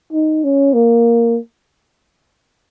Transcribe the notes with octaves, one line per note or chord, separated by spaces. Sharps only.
D#4
C#4
A#3